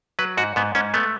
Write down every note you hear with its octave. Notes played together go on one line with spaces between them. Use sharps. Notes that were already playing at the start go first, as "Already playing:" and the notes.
F#3 B4
G#2 F#4
G#2 B3
G#2 C#4
A3 B3